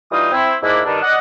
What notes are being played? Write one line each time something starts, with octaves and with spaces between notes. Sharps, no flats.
E3 G3 D#4 F4 G5 D#6
C4 E4
G#2 A#3 D4 E4
G2 D#3 G3 D4
D5 D#5 F#5